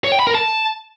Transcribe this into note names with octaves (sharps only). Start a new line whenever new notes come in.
C#5
G5
B5
A#4
A5